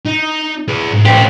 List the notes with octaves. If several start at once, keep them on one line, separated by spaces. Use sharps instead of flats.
D#4
G#4 B4
G#2
A2 A#3 G4 C5